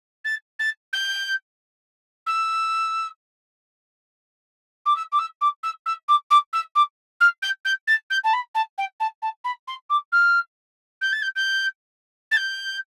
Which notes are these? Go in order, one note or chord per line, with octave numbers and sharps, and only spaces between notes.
A6
A6
G6
E6
D6
E6
D6
E6
D6
E6
E6
D6
D6
E6
D6
F6
G6
G6
A6
G6
A5
B5
A5
G5
A5
A5
B5
C6
D6
F6
G6
A6
G6
G6
A6
G6